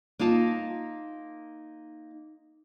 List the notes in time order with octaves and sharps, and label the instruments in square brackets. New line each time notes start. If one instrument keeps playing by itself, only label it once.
[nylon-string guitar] A#3 D#4 F4 A5